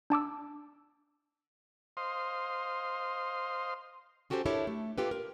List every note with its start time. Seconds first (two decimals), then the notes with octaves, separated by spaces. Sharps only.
0.10 D4 A5 D6 E6
1.97 C5 D#5 F5 C6
4.30 C#4 F#4 G4 A4 A#4 C5
4.46 D4 E4 G4 A4 A#4 C#5
4.67 A3
4.98 A#3 D4 F4 G4 A4 B4
5.11 A#4